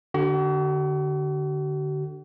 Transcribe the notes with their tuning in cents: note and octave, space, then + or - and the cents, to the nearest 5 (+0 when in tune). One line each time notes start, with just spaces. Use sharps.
D3 +0 F#4 +45